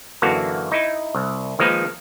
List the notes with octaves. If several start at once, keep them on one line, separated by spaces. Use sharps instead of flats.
F#2 D3 E3 A#3 F#4 A5
D#4 E4
C2
D#3 F3 G#3 A#3 D#4 B4